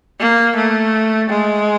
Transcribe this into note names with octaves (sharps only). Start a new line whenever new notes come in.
A#3
A3
G#3